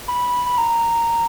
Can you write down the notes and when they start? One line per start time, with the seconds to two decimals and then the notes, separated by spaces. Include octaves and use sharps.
0.08 B5
0.46 B5
0.58 A#5